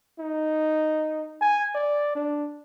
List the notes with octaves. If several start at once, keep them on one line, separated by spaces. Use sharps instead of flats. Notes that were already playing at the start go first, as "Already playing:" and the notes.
D#4
G#5
D5
D4